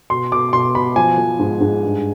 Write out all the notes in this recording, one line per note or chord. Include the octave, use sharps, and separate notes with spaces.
B2 C6
B2 D6
B2 C6
B2 B5
F3 G#5
F3
G#2
G#2
G2